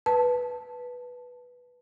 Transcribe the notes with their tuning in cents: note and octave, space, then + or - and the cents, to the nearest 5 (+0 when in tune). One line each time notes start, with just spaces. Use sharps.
B4 -5 A5 +0